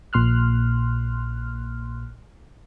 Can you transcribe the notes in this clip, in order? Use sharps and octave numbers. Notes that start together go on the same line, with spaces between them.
A#1 A#2 C6 F6 F#6